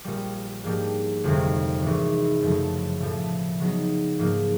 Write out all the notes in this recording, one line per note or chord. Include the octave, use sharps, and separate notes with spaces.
A#1 A#2 G3
G#2 F3 A#3 D4 G4
G1 F2 C3 D#3
G#1 G#2 E3
F#2 C#3 F3 A3
B1 A2 F3 A3
C#3 F#3 B3 D#4
G#2 F3 A#3